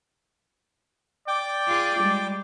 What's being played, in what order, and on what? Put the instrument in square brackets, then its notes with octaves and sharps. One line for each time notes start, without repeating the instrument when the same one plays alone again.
[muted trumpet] D5 [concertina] G5 D6
[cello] F4 G#4
G3 G#3